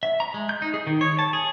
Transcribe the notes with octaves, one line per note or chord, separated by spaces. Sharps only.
E5
A#5
G#3
G6
D#4
G#4
D#3
C#5
A5
G#4